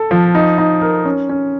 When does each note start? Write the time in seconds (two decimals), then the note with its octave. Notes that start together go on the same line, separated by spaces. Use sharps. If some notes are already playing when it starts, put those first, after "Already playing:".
Already playing: A4
0.11 F3
0.35 D#4
0.58 D#4
0.81 A#4
1.05 C#4
1.29 C#4